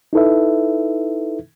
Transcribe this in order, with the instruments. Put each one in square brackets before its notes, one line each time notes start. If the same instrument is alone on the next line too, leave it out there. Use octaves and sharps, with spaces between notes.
[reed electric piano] D#4 E4 A4 B4 E5